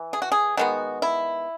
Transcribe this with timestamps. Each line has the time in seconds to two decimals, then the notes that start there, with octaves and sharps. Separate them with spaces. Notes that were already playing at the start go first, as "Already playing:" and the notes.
Already playing: E3
0.13 G#4
0.22 F#4
0.32 G#4
0.57 D#3 G#3 B3 F#4
1.02 E4